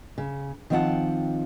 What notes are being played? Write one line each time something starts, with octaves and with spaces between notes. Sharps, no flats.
C#3
D#3 F3 C4 F4 F#5 A5